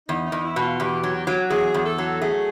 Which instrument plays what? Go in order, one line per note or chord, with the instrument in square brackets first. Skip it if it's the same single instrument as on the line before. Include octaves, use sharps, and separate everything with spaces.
[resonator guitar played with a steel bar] E2 [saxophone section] D#4
[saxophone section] D#4
[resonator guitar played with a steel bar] E2
[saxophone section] E4
[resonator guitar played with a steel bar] B2 [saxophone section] F#4
[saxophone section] F4
[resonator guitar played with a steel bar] E2 [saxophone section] G4
[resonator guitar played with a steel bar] F#3
F#3
[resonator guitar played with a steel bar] E2 [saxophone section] G#4
[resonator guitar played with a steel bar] E2
[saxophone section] A4
[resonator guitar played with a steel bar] F#3
[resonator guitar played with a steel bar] A3 [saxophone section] G#4